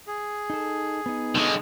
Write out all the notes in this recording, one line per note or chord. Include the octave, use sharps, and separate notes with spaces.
G#4
D#4 A4
B3 D#4
D3 G#3